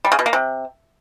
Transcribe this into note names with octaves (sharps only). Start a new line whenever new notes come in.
G3
C#3
B2
A#3
C3